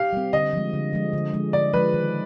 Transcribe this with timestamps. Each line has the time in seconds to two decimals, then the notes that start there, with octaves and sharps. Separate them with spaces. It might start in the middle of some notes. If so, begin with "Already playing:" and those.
Already playing: G4 F5
0.13 G3 C4
0.33 D3 D#5
0.53 F3 G#3
0.73 D3
0.93 F3 G#3
1.13 D3
1.33 F3 G#3
1.53 D3 D5
1.73 F3 G#3 B4
1.94 D#3